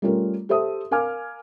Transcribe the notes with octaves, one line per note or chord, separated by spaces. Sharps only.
G3 A3 C#4 F4 A#4
G4 A4 C5 E5 D#6
A#4 F5 G#5 D6 F6